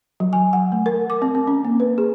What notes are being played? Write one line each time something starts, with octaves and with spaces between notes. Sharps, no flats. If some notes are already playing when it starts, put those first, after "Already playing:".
F#3
G#5
F#5
A3
A#4
D6
C4
C4
C#4
A#3
B4
G#4